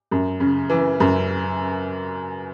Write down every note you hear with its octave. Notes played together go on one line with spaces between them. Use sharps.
F#2
C#3
E3
F#2